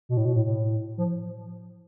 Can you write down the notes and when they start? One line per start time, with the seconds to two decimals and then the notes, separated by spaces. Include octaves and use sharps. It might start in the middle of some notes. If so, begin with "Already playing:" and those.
0.09 B2
0.17 A2
0.25 B2
0.36 A2
0.46 A2
0.98 F3